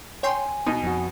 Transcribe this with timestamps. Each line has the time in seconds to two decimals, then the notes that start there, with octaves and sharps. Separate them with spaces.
0.23 C#5 G5 G#5 C6
0.66 B2 D#4
0.83 F2 F#4